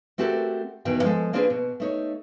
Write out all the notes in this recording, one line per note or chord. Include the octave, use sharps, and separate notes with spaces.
A3 C4 F#4 G4 A4 A#4
E2 B2 D#3 G5
F3 G#3 A4
A#3 C4 D4 F4 G#4 B4
B2
A3 D#4 C#5